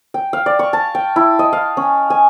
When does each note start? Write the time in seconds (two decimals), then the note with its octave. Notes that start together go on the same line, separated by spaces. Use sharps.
0.14 G5
0.33 F5
0.46 D5
0.59 C#6
0.73 A5
0.95 G5
1.16 E4
1.39 D#5
1.53 F5
1.77 C#4
2.10 G#5